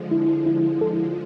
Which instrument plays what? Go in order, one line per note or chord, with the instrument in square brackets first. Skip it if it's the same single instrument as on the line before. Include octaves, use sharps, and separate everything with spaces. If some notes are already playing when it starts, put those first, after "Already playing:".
Already playing: [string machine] D3 F3 G#3
[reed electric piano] E4
[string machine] D3 F3 G#3 [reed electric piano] E4
[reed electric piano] A4
E4
F4